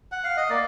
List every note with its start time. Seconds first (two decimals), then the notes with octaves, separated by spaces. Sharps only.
0.12 F#5
0.24 F5
0.37 D#5
0.50 A#3 D5